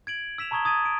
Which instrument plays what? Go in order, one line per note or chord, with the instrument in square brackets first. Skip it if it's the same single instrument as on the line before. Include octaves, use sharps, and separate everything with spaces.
[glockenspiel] G#6 D7 F#7
E6 B6 E7 F7
A5 A#5 C#6 D#6 G#6 G7
D#6 G#6 A6 D#7
D7